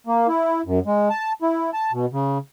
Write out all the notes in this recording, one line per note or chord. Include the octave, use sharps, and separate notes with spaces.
A#3
E4
F#2
G#3
A5
E4
A5
B2
C#3